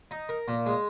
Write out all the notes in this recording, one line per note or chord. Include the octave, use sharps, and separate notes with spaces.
D#4
A#4
A#2
G#3